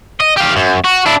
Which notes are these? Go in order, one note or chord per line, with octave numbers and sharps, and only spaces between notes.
D#5
G4 F5
F#2
F#4
D4 E4